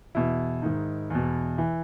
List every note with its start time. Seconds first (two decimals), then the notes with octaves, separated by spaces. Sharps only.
0.15 E2 B2 E4
0.62 G#2 D#3
1.10 E2 B2
1.58 E3